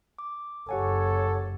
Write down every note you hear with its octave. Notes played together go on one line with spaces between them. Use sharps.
D6
F#1 G4 A4 C#5 F#5 G#5